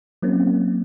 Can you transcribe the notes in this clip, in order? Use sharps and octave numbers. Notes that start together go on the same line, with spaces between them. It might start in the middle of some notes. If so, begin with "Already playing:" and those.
F#3 A#3 C4 C#4